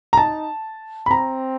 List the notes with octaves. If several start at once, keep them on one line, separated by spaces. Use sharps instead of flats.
A#5
D#4 A5
B5
C4 A#5